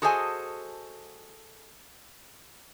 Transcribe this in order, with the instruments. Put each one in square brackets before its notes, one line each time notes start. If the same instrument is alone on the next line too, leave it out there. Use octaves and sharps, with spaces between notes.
[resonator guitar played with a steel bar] F#4 G#4 A4 C5 D#5 G#5